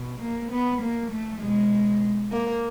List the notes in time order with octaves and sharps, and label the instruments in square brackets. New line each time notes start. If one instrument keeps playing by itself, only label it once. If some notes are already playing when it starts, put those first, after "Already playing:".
Already playing: [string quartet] B2
A#3
B3
A#3
A3
B2 G#3
A#3